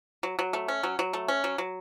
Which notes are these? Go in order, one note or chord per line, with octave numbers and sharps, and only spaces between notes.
F#3
F#3
A3
C#4
F#3
F#3
A3
C#4
F#3
F#3